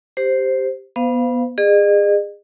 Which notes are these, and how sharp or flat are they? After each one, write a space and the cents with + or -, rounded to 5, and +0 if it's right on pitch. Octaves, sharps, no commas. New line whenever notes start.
G4 +0 C5 +0
B3 -20 C5 -35 F5 +0
G#4 -25 D#5 -45